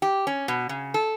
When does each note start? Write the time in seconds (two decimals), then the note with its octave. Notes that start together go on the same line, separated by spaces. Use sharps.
0.02 G4
0.27 C#4
0.48 B2
0.69 C#3
0.94 A4